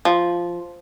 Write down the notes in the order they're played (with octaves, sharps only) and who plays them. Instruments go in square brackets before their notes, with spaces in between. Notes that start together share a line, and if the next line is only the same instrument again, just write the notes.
[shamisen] F3